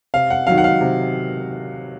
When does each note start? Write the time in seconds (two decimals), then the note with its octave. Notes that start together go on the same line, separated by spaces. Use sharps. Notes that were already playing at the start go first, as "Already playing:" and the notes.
0.14 C3 F5
0.30 F#5
0.47 D#3 F#3 F5
0.58 F#5
0.64 F5
0.81 C3